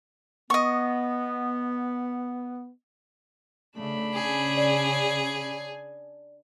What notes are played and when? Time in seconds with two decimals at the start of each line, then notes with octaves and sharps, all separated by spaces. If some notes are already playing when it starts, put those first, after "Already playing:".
0.50 B3 D#5 C#6
3.77 C#3 A3 D4 B5
4.13 C#3 C#4 G#4
4.57 D5